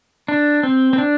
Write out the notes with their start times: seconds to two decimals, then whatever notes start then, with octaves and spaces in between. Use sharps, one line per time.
0.28 D4
0.63 C4
0.93 C4
0.98 D4